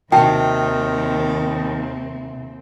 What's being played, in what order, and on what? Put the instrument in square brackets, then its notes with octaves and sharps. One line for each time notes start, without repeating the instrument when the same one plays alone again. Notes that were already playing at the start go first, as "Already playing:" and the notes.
[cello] D#2 C4 [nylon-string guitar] C3 F#4 [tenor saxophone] D#3 [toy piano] G5 A5